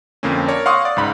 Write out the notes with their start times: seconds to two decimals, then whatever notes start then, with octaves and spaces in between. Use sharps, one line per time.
0.23 F2 D3 A#3 C4 C#4
0.48 A#4 C#5 D5
0.66 F5 F#5 C6 C#6 D#6
0.85 D5
0.97 C#2 G#2 B5